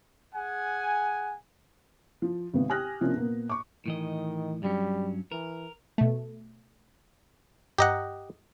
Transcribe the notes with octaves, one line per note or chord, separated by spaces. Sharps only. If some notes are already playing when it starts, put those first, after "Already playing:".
G#4 F#5 G#5
F3
G#1 C3 B3
G4 G#5 D#6 F6 F#6 A#6
C3 F3 A#3 C#4 D4
A#2 A#3 B3
C#6 D6
A2 D#3 E3 D#5
G2 F#3 G3 C#4
E3 A#4
B2 A3
G2 G4 D#5 F#5 A#5